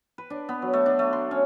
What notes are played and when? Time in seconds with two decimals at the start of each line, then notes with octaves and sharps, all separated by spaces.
0.18 B4
0.30 D4
0.49 B3
0.62 F#3
0.73 A3
0.86 D4
0.99 A3
1.13 C6
1.31 C#4